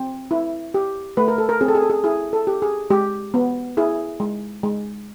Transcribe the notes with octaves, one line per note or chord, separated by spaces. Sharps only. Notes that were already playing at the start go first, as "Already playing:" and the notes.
Already playing: C4
E4
G4
A3 B4
A#4
A4
A#4
C4 G#4
A4
G#4
A4
G#4
E4 G#4
A4
G4
G#4
G#3 G4
B3
E4 G#4
G#3
G#3